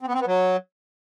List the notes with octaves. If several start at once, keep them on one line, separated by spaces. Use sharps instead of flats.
C4
B3
C4
B3
F#3